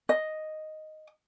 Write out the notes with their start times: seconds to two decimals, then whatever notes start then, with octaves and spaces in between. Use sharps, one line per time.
0.09 D#5